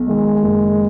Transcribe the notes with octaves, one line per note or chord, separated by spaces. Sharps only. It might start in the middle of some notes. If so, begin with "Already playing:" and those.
Already playing: B1
D#3 G#3
F#1